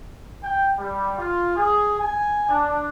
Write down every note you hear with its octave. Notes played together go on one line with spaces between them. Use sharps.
G5
G3
F4
G#4
G#5
D4